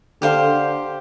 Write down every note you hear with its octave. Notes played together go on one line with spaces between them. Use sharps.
D3 G4 C5 F5